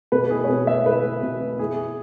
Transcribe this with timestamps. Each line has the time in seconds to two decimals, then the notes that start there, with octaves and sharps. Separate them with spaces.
0.12 B2 B4
0.30 E4 G#4
0.44 C#5
0.49 B2 B4
0.67 B3 E5
0.86 E4 B4
1.04 B3
1.23 B2
1.41 B3
1.59 E4 G#4
1.78 E4